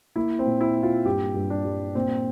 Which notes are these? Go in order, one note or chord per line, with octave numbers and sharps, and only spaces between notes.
A#3 E4
C4
A#2
E4
A#3
F4
G2 G4
G2
D4
G3
A#2 C4